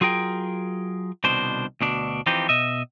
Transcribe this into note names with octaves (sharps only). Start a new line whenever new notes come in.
F#3 F4 G#4 A#4 G5
C2 B2 D#3 D4 C5
D2 B2 D4
E3 F3 C4 D#4 G4
B2 D#5 E5